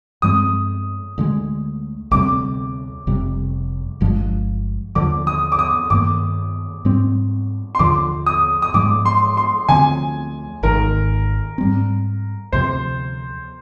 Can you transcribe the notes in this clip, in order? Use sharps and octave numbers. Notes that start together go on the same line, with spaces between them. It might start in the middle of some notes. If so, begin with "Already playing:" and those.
G2 F3 G#3 C4 D#6
D2 D3 G#3
D2 C3 G3 C4 D6
F1 F2 C3 G3
G1 G2 F3 G#3
D#2 D3 F3 D6
D#6
D6
D#6
G2 D#3 A#3 D6
G#2 G3 C4
C6
D#2 D3 F3 D6
D#6
D#6
G#2 F3 G#3 D6
C6
C6
D2 D3 F3 C4 G#5
G#1 G#2 D#3 A#4
G#2 G3 C4
D2 C3 F3 C5